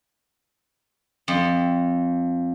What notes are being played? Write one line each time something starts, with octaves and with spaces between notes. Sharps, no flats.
F2